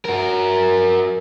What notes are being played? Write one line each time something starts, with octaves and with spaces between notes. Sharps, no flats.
F#4 A#4